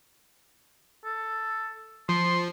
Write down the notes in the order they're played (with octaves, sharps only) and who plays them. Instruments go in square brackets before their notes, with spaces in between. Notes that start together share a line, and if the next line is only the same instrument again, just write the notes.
[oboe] A4
[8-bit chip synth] F3 [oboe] C6